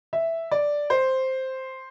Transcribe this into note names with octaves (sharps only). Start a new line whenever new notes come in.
E5
D5
C5